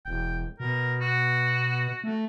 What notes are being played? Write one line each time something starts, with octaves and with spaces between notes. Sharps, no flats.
E1 G5
B2 A#4
F#4
A3